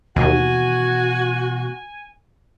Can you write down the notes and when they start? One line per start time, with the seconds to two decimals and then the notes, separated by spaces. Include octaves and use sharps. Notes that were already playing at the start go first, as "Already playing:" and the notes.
0.16 D#2 B2 E3 A3 F#4 G#5